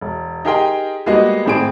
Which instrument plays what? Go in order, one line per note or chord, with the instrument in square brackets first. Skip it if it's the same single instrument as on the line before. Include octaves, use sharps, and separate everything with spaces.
[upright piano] E1
D#4 G4 G#4 A#4 G5 C6
G3 G#3 A#3 B3 F#4 D#5
G#1 A2 C4 G#4 D7